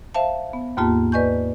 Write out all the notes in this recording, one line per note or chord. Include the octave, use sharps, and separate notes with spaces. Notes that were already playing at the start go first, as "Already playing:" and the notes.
C5 E5 F5 A5
B3
D#2 G#2 A#3 F4 G4 A5
B4 D5 D#5 G#5 C#6 G6